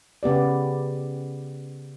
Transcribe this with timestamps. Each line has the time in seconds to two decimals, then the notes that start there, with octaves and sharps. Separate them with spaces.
0.23 C#3 B3 G4 D5